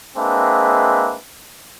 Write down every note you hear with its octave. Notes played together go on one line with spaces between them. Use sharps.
G#3 A#3 C4 D4 B4 E5